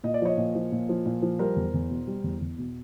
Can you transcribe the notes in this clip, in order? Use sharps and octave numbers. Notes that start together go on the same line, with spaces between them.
A#2 D#5
D5
F3 C#5 D#5
A#2
F3
A#2
F3
A#2
F3
G3 A#4 C5
E2
E2
B2
G3
E2
E2
B2